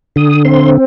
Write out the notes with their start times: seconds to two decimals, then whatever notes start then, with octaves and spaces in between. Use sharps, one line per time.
0.16 D3 D#6
0.45 C4 C6